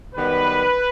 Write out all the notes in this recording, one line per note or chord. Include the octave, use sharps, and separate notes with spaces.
F#2 D#3 G3 B3 B4